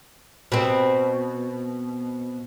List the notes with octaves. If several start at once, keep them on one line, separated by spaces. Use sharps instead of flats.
B2 C4